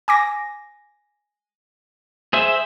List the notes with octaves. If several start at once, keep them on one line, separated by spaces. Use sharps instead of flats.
G#5 D6 A#6
G#4 C5 E5